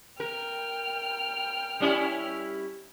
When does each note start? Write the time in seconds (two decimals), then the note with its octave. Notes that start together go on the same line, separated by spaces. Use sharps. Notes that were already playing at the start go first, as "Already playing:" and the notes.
0.20 A#4 G5 F6
1.80 G3 C#4 E4